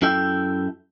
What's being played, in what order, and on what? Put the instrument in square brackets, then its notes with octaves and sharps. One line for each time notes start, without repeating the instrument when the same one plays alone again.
[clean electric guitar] F#2 E4 A4 E5 G5